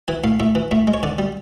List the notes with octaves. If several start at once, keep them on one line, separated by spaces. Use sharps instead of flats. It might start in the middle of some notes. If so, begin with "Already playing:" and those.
E3 G#5
A2 F5
A2 E5
E3
A2 E5
G#3
C#5
D3 D5
G3